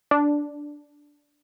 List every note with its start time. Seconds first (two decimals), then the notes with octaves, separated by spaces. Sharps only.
0.11 D4